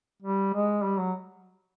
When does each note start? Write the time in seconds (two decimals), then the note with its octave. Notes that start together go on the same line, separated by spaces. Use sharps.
0.22 G3
0.54 G#3
0.84 G3
0.99 F#3